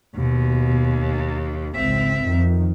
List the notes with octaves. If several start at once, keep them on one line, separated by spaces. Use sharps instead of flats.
D#2 B2
G#1 C#2 C4 E5
F2 D#3